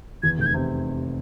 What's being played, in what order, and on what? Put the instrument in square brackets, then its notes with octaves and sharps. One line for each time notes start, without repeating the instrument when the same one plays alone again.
[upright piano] E2 [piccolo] G#6
[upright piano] F1 [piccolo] G6
[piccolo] G#6
[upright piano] C3